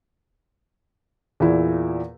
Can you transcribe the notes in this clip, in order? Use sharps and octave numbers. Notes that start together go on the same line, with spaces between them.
E2 A#2 E4